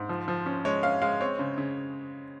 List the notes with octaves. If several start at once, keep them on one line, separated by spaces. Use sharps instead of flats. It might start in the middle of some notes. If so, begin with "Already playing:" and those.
Already playing: G#2
F3
F3
C#4
G#3 C#5
C#4 F5
G#3 F5
C4 C#5
C#3
C#3